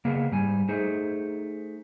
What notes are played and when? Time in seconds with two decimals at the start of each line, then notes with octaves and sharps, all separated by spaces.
0.05 C#3 A#3 B3 G#4
0.32 G#2 G3 G#5
0.69 A3 D#4 G#4 C5